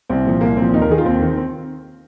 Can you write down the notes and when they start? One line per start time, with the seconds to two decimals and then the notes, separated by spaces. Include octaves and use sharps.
0.09 C2 C4
0.25 A#2 F3
0.41 C2 A#3
0.57 A#2 C4
0.62 F3
0.69 C4
0.73 D#2 D#4
0.81 A#4
0.90 D#3 G#4
0.98 F4
1.05 D#2 C4
1.22 D#3
1.37 C4